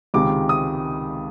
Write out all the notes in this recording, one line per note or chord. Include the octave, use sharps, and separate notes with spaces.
C#2 C3 D#3 G#3 D6
D#6